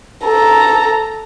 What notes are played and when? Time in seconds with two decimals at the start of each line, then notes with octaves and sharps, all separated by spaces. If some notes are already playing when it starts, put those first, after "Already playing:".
0.25 A4 A#5